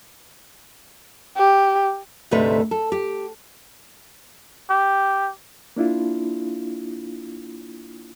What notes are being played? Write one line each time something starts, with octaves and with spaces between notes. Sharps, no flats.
G4
D2 G#2 C3 A3 B4
A4
G4
G4
A#3 D4 E4 F4